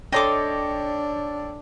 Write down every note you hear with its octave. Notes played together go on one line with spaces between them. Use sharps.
D4 A4 C#5 D#5 G5 C6 D6